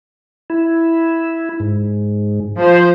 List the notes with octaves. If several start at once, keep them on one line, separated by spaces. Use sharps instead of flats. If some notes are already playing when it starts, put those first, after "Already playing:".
E4
G#2
F3 C5